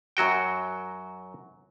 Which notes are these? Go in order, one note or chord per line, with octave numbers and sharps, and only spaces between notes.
F#2 F#3 F#4 G5